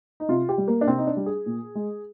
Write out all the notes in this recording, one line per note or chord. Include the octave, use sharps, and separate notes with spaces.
D#4
C3 F4
G4
G3
A#3
D4
C3 C4
D#4
D4
G3
G#4
A#2
G#3